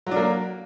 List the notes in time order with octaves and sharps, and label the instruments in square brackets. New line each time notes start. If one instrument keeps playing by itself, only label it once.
[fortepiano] F#3
D4
A#3